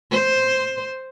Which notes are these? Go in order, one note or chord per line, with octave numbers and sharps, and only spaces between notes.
C5